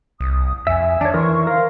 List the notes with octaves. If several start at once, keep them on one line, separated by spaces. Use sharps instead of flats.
C2 D#6
F2 E5 G#5
D#3 D4 C#5 D5
E3 A#4 C5 C#6
A#4 C5 F5